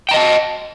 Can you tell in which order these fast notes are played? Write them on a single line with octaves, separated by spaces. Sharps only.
G5 A#5 D#5 A5